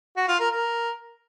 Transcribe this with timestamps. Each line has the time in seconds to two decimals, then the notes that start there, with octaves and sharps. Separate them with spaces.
0.16 F#4
0.28 F4
0.39 A#4
0.51 A#4